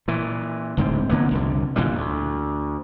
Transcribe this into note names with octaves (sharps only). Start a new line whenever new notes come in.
A#2 E3
D1 G#2 D3 C4
D3 A#3 B3
C2 F2 D3
A#2 D3 E3 G3
D2